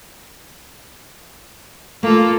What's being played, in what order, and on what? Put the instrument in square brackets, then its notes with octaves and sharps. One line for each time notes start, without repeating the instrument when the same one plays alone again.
[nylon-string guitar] A3 [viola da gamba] A#3 F4 A4